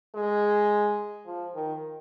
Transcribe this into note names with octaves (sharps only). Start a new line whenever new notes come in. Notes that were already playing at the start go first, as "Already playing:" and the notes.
G#3
F3
D#3